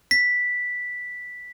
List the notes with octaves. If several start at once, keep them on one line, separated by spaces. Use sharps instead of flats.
B6